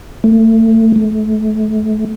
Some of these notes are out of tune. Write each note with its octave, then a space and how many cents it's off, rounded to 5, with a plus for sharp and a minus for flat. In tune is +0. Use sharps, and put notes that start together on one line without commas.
A3 +30
A3 -30